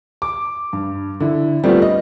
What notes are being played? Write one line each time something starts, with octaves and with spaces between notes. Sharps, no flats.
D6
G2
D3 E4
G3 A3 B3 C4 F4
D#5